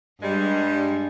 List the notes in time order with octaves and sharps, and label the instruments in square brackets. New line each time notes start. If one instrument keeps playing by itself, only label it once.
[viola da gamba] G2 [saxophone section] G3 G#3